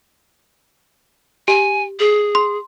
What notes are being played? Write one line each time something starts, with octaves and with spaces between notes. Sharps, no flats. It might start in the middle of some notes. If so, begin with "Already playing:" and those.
G4 G#5
G#4
C6